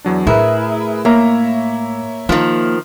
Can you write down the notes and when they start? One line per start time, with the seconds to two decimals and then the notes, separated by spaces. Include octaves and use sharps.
0.05 E2 F#3 D4
0.27 A2 E4 G#4 A#4 B4
1.05 A#3 C#5 E5 A#5
2.29 D#3 F3 A#3